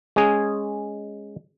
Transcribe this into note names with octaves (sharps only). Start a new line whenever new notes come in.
G#3 C#4 G#4